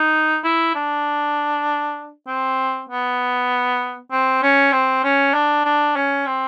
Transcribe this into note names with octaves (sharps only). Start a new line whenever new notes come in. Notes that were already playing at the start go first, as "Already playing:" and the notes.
Already playing: D#4
E4
D4
C4
B3
C4
C#4
C4
C#4
D4
D4
C#4
C4